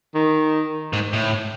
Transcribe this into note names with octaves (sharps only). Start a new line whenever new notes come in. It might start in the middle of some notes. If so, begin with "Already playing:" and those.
D#3
G#2
A2